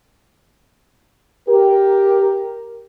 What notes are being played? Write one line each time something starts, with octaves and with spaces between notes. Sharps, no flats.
G4 A#4